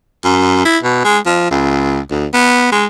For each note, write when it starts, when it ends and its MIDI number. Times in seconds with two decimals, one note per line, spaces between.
0.25 0.64 42
0.65 0.78 64
0.83 1.03 47
1.05 1.18 56
1.26 1.46 53
1.51 2.00 37
2.11 2.27 38
2.34 2.70 59
2.72 2.85 56